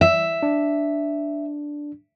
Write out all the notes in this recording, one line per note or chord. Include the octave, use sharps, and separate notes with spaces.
E5
D4